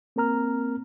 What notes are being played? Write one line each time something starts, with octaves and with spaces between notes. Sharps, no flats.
A#3 C4 A#4 A#5 F6